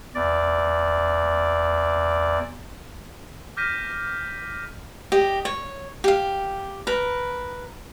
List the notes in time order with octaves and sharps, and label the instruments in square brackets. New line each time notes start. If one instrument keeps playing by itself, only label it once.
[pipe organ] E2 D5
[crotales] D6 F6 G6 A#6 B6 D#7
[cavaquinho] G4 D#5
C#5
G4 F5
A#4 B4